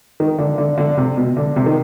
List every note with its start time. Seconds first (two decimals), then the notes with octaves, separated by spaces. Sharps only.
0.20 D#3
0.39 D3
0.58 D3
0.78 D3
0.97 C3
1.17 B2
1.37 D3
1.56 C3
1.66 D#3